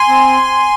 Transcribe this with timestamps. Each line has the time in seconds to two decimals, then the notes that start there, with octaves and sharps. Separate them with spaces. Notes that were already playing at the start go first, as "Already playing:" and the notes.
Already playing: G#5 C6
0.08 C4